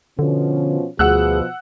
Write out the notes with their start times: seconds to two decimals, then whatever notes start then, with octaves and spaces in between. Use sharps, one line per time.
0.19 B2 D3 F3 C#4
0.99 D2 B2 F3 G#4 F#5 E6 F#6